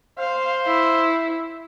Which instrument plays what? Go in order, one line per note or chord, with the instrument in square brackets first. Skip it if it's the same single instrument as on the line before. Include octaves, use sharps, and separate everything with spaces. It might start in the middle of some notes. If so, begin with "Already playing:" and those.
[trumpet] C5 [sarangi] F5
[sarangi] E4